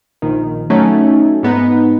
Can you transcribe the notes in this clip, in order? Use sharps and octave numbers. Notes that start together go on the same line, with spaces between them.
A#1 D#3
F#3 A3 C#4 D#4
G#2 B3 D#4